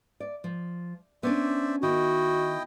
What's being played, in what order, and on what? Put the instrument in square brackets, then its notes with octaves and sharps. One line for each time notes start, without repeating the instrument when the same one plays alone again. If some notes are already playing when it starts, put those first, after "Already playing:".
[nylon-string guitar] D5
F3
[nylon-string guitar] B3 C#4 D4 [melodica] C5 D5 E5
[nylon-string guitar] D#3 [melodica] E4 D#5 G5 [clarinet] F#4